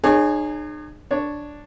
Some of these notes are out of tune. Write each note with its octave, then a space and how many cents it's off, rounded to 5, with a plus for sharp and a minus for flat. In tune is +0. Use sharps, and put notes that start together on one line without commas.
D#4 -45 G#4 +0 C#5 -20
D4 +0 C#5 +0